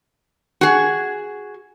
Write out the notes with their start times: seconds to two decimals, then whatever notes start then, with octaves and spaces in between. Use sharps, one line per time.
0.61 F#4 G#4